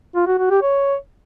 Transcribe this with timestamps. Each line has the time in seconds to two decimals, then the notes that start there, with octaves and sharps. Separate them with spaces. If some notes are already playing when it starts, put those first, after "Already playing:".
0.15 F4
0.27 F#4
0.39 F#4
0.50 G4
0.62 C#5